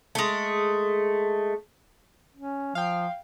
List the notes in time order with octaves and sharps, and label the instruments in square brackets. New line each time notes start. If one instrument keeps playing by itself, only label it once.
[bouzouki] G#3 A3
[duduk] C#4
[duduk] F3 [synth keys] F5 G5